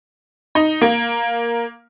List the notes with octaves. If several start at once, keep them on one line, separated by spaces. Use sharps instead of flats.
D#4
A#3